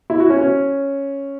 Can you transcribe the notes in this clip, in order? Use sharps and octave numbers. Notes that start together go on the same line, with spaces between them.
E4
F#4
C#4
C#4